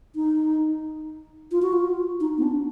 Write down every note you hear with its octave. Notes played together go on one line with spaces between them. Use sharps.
D#4
F4
F#4
F4
D#4
B3
D4